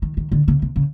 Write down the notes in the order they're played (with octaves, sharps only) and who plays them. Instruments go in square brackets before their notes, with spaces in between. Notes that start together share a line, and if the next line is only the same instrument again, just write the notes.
[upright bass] D#3
D#3
D3
C#3
C3
C#3